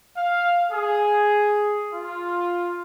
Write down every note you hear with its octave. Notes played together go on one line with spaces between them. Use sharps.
F5
G#4
F4